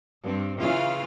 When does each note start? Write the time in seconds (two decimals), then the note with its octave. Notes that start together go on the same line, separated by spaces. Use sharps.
0.24 G2 C4
0.60 C#3 E3 F4 F5